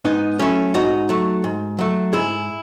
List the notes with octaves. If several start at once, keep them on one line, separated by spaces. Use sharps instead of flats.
G#2 B3 D#4
F#3 A3 C#4 E4
G#2 D#4 F#4
F#3 A3
G#2
F#3 A3
G#2 E4 G#4